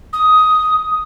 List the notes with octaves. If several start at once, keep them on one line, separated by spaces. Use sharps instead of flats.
D#6